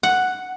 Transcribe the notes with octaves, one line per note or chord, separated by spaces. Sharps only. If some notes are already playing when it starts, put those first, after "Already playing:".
F#5